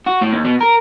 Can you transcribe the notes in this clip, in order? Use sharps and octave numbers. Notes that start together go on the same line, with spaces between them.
F#4
A2
D#2
B2
A#4